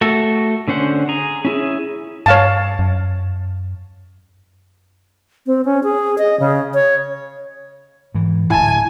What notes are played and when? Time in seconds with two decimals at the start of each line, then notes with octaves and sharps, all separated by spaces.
0.01 A3 F#4 A4
0.68 D3 C#4 C5 F#5
1.09 G#4 A#5
1.45 C#4 E4 G#4
2.26 G2 C#5 F5 A5
2.79 F#2
5.47 C4
5.65 C#4
5.84 G#4
6.18 D#5
6.40 C#3
6.74 C#5
8.15 G#2 E3
8.50 D1 A2 E4 G#5 A5